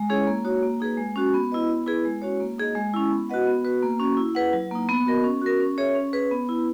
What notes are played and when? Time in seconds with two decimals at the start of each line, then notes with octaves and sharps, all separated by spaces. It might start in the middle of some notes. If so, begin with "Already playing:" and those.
Already playing: G#3
0.09 C#4 E4 G#4 C#5
0.27 A#3
0.45 D#4 F#4 C#5
0.63 A#3
0.80 D#4 G#4 B4
0.97 G#3
1.16 C#4 F#4
1.34 B3
1.52 E4 B4 D#5
1.69 B3
1.86 E4 G#4 B4
2.05 G#3
2.22 C#4 F#4 C#5
2.40 A#3
2.58 D#4 G#4 D#5
2.75 G#3
2.94 C#4 E4
3.11 B3
3.29 F#4 B4 D#5 F#5
3.47 B3
3.65 F#4 B4
3.83 A#3
3.99 C#4 F#4
4.17 E4
4.35 G#4 B4 F#5
4.53 F#3
4.71 A#3 D#4
4.89 B3
5.06 F#4 A#4 D#5
5.24 C#4
5.42 F#4 A#4
5.60 C#4
5.78 G#4 C#5 E5
5.95 C#4
6.13 G#4 B4
6.31 B3
6.49 E4 B4